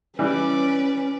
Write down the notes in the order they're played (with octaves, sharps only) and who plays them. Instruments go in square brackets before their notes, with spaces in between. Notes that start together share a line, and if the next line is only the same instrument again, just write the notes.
[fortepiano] E3 G3 [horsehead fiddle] C#4 [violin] B4 D5